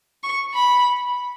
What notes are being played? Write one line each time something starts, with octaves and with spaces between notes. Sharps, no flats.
C#6
B5